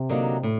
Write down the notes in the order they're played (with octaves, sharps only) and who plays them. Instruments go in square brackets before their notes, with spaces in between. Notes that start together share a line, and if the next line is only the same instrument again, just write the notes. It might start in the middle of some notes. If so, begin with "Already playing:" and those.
Already playing: [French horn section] C3
[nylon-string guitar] D3 F#3 A#3 D#4
A2